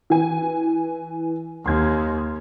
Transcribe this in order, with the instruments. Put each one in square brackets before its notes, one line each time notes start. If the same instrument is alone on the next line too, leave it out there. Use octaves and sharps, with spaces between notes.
[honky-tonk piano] E3 G#5
[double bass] D#2 [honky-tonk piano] C6 G#6